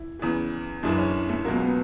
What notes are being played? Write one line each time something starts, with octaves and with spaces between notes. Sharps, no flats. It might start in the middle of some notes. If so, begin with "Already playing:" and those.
Already playing: E4
E2 C#3 E3
F#1 F#2 C#3 E3 D4
C#4
A3
C#2 B2 F#3 A#3
B3